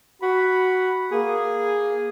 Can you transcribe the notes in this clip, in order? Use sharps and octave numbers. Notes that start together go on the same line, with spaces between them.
F#4 B5
A#3 G#4